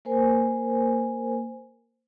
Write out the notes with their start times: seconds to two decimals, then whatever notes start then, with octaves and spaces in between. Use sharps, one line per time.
0.05 A#3 A#4 C5 G#5